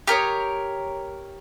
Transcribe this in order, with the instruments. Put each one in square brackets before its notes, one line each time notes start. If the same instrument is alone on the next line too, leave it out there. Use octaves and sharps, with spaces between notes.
[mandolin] G4 A#4 C#5 D#6